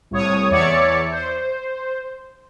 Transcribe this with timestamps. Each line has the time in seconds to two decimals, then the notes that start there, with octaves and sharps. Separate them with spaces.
0.11 C2 A2 C#5 D#6
0.50 E2 C#5 D5 E5 D6 C#7
1.11 C5